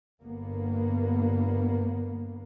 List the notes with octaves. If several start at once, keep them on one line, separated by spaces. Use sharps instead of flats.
G1 A#3 B3